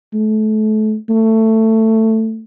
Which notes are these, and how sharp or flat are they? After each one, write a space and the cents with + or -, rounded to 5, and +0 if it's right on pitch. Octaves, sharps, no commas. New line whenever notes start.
A3 -30
A3 +15